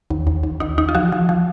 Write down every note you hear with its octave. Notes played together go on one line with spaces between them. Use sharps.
D#2
D#2
D#2
D#2 D#4
D#2 D#4
F4
F3 F#4
F3
F3